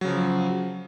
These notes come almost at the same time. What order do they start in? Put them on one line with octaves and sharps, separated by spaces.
F#3 C#3 F3